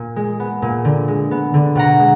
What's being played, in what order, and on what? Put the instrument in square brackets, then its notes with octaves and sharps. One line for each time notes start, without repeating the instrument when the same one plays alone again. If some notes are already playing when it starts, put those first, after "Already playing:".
Already playing: [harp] A#2
G#3
B3
A#2
D3
G#3
B3
D3
B2 F#5 A#5
G#3